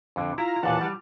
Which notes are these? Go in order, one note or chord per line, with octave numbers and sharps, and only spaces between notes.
F2 D3
E4 F4 A#5
D#2 A#2 E3 F#5 A5
G3